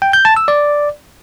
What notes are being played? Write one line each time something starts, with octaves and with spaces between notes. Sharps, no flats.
G5
G6
A5
E6
D5